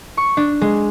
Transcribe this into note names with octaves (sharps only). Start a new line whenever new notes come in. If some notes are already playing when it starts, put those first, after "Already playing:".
C#6
D4
G#3